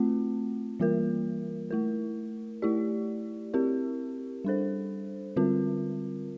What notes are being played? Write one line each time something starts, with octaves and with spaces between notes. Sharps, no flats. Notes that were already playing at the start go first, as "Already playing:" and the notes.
Already playing: A3 C4 F4
E3 G3 A#3 F4 A#4
A3 E4 A#4
A3 E4 G4 D5
C4 E4 G4 A#4
G3 D4 A4 C5
D3 G3 C4 F4 A#4